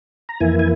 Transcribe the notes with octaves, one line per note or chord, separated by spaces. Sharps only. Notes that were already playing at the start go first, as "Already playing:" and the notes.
A#5
F2 E3 A#3 E4 G#5
G#5